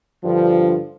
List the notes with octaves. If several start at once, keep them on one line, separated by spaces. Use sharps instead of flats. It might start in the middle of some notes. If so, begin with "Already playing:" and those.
G2 D3 F3